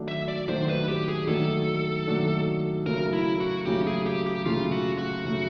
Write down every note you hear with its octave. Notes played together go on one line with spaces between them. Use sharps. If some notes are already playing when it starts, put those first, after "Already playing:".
Already playing: D#3 F#3 A3 D4 F#4
E5
D5
D#3 F#3 A3 D4 F#4 C5
B4
G4
G#4
D#3 F#3 A3 D4 F#4 A4
D#3 F#3 A3 D4 F#4
C#3 F#3 A3 A#4
E4
F#4
C#3 F#3 A3 G4
G#4
G4
G4
C#3 F#3 A3 F4
F#4
F#4
C#3 F#3 A3